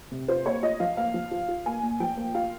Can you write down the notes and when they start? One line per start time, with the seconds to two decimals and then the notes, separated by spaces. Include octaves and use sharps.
0.11 C3
0.28 F4 C5
0.46 A#3 C#5
0.63 F4 D#5
0.80 F3 F5
0.97 A#3 F5
1.14 F3
1.31 F4
1.48 F4
1.66 A#3 G#5
1.83 A#2
2.00 F3 G5
2.17 A#3
2.35 F4 F5